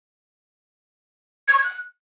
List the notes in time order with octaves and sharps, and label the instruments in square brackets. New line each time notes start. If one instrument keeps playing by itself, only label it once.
[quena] G#6
C#6
G#6
F#6